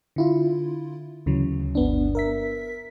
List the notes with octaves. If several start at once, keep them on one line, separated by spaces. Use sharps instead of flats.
D3 E4 F4
D2 C#3 E3 F#3
G1 B3 D4
A#4 E5 B6